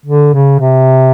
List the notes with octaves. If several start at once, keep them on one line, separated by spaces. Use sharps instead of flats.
D3
C#3
C3